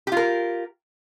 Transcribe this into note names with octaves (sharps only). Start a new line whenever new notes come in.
F4 G4 A#4